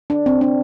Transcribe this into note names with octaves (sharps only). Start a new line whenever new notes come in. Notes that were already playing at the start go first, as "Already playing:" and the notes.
D4
C4
D4